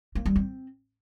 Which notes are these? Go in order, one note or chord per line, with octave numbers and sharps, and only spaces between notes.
A#3
G3
C4